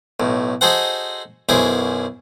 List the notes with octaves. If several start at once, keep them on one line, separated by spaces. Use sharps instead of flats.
B1 A2
D#4 F#4 G#4 A4 C5 F#5
B1 F#2 E4 G#4 C5